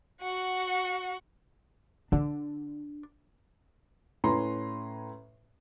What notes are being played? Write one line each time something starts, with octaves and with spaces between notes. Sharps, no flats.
F#4 F#5
D3 D4
A2 C#4 E4 B4 A#5 C6